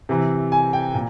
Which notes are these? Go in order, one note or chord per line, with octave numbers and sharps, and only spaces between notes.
C3 E3
G#5
G5
A#2